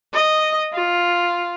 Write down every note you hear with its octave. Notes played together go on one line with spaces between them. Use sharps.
D#5
F4